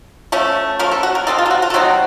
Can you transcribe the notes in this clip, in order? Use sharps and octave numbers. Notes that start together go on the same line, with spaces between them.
F3 A3 C#4
F3 A3 C#4 A#4
A4
F#4
A#4
C3 F#3 C4 D#4 A4
F4
A4
F#4
F4
A4
C3 F#3 C4 D#4 F#4